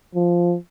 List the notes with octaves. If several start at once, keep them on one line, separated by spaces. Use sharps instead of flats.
F3